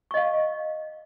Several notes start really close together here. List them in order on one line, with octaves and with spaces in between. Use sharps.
C#6 D#5 F5